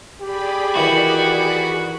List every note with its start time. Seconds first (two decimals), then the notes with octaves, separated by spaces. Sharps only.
0.21 G4 G#4 D5 B5
0.75 D#3 E3 F#4